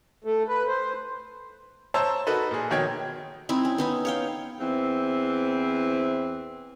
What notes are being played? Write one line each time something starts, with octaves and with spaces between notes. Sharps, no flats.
A3
B4
C5
C5 C#5 A5 A#5 E6
D#4 F#4 A4 B4
A#2 G#4
B2 D#3 C#5 G5 G#6
C4 D#4 E4
C#4
B3 D#4 E4
C#5 F5 G5
E2 E3 C4